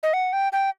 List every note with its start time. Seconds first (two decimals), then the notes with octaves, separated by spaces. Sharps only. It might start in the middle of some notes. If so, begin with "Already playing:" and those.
0.03 D#5
0.13 F#5
0.33 G5
0.53 G5